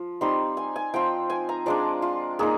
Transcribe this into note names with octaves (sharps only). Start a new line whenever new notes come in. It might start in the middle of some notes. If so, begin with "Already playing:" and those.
Already playing: F3
G3 C4 D#4 C6
G#5
G#5
F3 C4 F4 G5
G#5
A#5
F3 G#3 D4 D5
F4
A#3 D#4 G#4